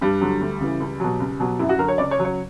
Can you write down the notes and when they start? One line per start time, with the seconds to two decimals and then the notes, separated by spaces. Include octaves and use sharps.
0.01 G2 G3
0.21 D3 F#3
0.41 D2
0.60 C#3 E3
0.80 C#2
1.00 B2 F#3
1.20 C#2
1.40 B2 F#3
1.59 F#2 E4
1.69 F#4
1.78 D3 F#3 A#4
1.88 C#5
1.98 C#2 D5
2.11 C#5
2.18 C#3 F#3
2.25 C#5